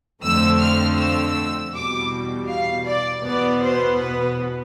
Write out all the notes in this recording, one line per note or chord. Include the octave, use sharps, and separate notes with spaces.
F2 D3 F3 A3 C4 E6
F6
E6
E2 B2 G3 D6
F5
D5
E2 B2 B3 D5
C5
B4